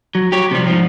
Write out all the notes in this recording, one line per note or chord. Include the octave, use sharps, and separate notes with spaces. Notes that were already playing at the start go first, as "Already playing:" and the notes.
F#3
G4 C#5
C3 F3 G3
G#2 F3